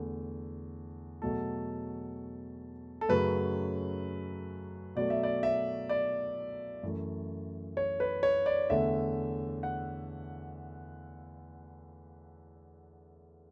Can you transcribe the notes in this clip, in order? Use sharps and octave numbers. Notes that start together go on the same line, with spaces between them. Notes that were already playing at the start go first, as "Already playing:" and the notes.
Already playing: E2 D3 A3
E2 B2 F#3 A3 A4
A4
F#2 C#3 F#3 A3 B4
B2 F#3 A3 D5
E5
D5
E5
D5
F#2 E3 A3
C#5
B4
C#5
D5
E2 D3 A3 E5
F#5